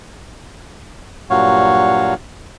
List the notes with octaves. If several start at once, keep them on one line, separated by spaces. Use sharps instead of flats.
G2 A#2 F#3 F#4 C#5 F5